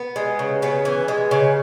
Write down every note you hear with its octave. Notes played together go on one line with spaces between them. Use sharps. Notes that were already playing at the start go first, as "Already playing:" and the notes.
Already playing: B3
G#3
C#3
C#3 B3
E3
G#3
C#3